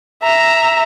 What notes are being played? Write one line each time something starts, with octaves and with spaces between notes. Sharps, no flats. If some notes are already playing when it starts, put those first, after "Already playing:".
E5 A#5